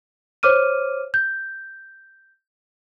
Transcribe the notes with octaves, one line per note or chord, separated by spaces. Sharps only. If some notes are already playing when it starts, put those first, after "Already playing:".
C5 C#5 D6 F6 D#7
G6